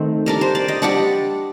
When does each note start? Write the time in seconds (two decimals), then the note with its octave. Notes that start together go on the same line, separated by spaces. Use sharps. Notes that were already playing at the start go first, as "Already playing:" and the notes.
Already playing: D#3 A3 C4
0.26 G3 D4 A#4
0.41 C5
0.55 D5
0.68 D#5
0.82 G3 D4 D5 F#5